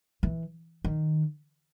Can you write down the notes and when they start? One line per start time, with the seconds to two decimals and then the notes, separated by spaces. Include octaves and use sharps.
0.23 E3
0.85 D#3